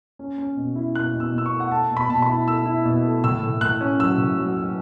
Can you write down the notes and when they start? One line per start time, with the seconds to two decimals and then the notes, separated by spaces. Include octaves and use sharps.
0.19 C#4
0.38 C#4
0.56 B2
0.75 E4
0.95 B2 F#6
1.14 B2
1.20 E6
1.33 B2
1.38 E6
1.46 C#6
1.52 A3
1.60 F#5
1.71 A3 A5
1.90 B2
1.97 B5
2.09 B2 A5
2.22 B5
2.29 E4
2.47 A3 E6
2.66 E4
2.85 B2
3.05 A3
3.24 A2 E6
3.43 A2
3.61 A2 F#6
3.81 C#4
3.99 F#3 E6
4.18 A2
4.38 F#3
4.57 F#3